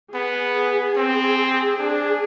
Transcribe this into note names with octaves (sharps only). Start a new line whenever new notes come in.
B3 G#4
C4
D4